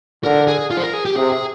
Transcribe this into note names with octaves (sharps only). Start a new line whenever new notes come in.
D3 A#4
G#4
F4
C5
A#4
G#4
G4
C3 G#4
G#4